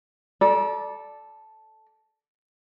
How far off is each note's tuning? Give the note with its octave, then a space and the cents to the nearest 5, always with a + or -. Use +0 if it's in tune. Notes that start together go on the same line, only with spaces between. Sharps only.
A4 -5 D5 +0 A#5 +45